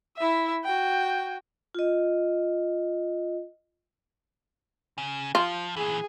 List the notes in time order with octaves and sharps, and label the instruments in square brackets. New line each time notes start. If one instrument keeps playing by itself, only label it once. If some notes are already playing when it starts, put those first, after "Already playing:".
[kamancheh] E4 E5
F#4 G5
[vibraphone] F4 D#5
[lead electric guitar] C#3
[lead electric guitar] F3 [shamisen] F4
[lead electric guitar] A#2 E3 [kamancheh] G#4